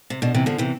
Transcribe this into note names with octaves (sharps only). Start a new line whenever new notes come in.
C3
B2 D3
C3 E3
D3 F3
C3 E3